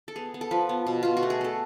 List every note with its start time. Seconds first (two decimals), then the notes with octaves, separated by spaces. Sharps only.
0.08 A4
0.16 B3 G#4
0.34 B3
0.41 A4
0.51 F3 B4
0.69 B3
0.87 B2
1.03 B2 F4
1.17 F#4
1.23 A3
1.30 G#4
1.41 A3 A4